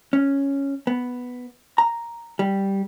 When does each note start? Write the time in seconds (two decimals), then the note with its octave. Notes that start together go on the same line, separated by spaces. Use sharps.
0.13 C#4
0.87 B3
1.78 A#5
2.39 G3